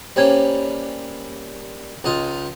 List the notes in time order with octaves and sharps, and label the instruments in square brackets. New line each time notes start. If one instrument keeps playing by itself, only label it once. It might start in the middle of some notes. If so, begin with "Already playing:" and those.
[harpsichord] G3 A#3 C#4 [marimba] C5 C#5 G#6
[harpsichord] C#2 D#4 F4